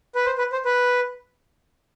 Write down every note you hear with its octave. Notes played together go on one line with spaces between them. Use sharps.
B4
C5
B4
C5
B4